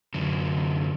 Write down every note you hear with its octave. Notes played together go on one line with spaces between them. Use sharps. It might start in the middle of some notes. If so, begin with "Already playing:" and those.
F#2 D3